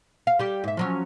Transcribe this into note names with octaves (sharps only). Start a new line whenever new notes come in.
F5
G3 G4
G#2 E5
F3 F#3 C#4